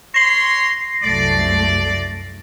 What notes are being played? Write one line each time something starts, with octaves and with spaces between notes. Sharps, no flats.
C#5 C6 A#6 C7
C2 F#2 A3 D5